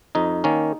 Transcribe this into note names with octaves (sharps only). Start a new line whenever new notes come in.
F2 D#4
D#3 A#3 C#4